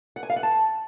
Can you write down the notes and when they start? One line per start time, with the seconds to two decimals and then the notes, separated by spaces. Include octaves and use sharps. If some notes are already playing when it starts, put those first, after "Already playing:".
0.16 F#5
0.23 G#5
0.30 F5
0.36 F#5
0.43 A5